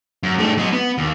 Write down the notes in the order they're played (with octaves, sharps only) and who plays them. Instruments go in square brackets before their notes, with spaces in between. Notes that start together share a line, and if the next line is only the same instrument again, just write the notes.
[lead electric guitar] F#2
G2 A3
F#3 D#5
B3
D#2